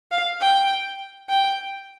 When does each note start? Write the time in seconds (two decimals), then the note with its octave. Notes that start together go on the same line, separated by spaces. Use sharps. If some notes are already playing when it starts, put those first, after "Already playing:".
0.11 F5
0.41 G5
1.29 G5